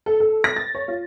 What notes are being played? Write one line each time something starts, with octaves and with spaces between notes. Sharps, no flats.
A4
A4
A#6
A6
C#5
F4